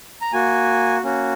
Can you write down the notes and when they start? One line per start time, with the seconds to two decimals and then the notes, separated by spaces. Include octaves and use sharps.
0.21 A#5
0.33 A#3 F#4 G#5
1.03 A#3 C#4 F#4